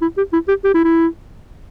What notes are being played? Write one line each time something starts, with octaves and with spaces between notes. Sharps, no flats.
E4
G4
E4
G4
G4
E4
E4